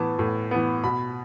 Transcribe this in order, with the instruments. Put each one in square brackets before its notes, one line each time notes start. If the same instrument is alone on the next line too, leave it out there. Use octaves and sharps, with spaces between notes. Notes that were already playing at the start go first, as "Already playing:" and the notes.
Already playing: [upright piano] A2 E3 B3 A5
A2
E3 B3
B2 B5